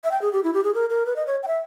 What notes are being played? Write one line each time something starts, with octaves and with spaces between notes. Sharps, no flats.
E5
G5
G#4
G4
E4
G4
G#4
A#4
A#4
B4
D#5
C#5
G5
E5